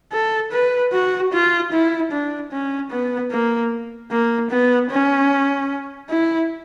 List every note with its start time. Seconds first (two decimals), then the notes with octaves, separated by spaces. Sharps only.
0.12 A4
0.52 B4
0.92 F#4
1.32 F4
1.72 E4
2.12 D4
2.52 C#4
2.91 B3
3.31 A#3
4.11 A#3
4.50 B3
4.90 C#4
6.09 E4